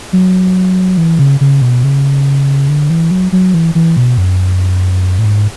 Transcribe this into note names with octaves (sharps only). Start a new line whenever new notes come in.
F#3
E3
C#3
C#3
B2
C#3
D3
E3
F#3
F#3
E3
E3
B2
F#2
A2
G#2